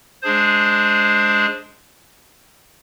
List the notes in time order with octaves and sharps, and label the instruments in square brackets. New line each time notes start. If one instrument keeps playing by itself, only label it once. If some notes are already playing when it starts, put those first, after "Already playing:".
[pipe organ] G#3 D4 G#4 C5